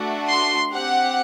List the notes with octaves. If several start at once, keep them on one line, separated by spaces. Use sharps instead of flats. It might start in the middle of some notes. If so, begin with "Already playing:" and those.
Already playing: A3 D4 F#4
C6
C4 G4 F#5